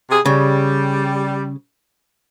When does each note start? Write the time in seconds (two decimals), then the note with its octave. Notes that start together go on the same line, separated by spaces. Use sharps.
0.10 C3 G#4
0.26 C#3 G3